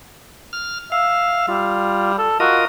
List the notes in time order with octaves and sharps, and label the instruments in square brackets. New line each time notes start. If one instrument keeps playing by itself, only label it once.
[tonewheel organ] F6
[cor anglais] E5 [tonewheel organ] F5
[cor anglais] G3 [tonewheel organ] F4
[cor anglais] A4
[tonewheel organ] F4 A#4 D#5 [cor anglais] F#4